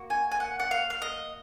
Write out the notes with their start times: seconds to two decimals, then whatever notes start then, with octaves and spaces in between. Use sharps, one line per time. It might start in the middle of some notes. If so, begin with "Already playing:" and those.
Already playing: A#3 F#4
0.10 G#5
0.31 G#5
0.40 F#5
0.60 F#5
0.71 F5
0.90 F5
1.02 D#5